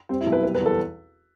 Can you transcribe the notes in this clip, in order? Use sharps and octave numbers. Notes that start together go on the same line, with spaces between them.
G3 C4
E4
B1
B4
G3 B4
B4
E2
A4